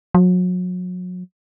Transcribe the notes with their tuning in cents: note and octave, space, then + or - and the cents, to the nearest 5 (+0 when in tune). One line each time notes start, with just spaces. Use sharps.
F#3 -35